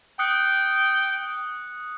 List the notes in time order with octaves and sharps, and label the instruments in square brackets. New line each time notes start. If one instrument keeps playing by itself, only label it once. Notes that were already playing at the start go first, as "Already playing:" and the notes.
[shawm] G5 [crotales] D#6 F#6 C#7